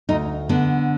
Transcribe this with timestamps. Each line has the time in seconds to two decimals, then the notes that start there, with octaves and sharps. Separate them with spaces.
0.09 D2 D#4
0.49 D3 B3